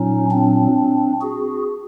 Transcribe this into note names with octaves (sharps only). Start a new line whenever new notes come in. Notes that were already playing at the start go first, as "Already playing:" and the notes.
Already playing: A#2 F#3 C#4 D#4
C4 D4
F#4 G#4